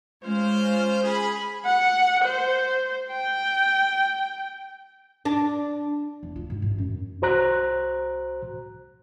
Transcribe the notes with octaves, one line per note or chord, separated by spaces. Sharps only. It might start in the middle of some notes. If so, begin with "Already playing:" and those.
G#3 C#4 F4 C5 F6
G#4 B5
F#5
C5
G5
D4
E2
F4
G#2
A1
F#2
C2 F#4 C5 A#5 F#6